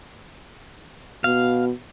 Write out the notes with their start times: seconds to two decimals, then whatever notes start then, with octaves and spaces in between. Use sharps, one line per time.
1.24 B2 F5